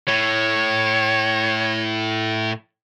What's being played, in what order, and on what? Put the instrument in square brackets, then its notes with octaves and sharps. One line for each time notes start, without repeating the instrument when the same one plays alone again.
[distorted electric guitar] A2 [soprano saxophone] C#5